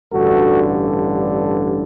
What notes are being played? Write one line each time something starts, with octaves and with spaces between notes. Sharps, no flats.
A1 G2 D3 F#4 A4